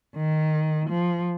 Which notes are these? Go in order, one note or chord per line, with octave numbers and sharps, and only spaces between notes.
D#3
F3